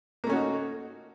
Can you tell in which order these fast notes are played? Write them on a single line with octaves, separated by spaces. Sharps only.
A#3 A3 C#4 F#4 D#4